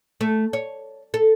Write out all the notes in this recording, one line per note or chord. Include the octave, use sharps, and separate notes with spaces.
A3
C#5
A4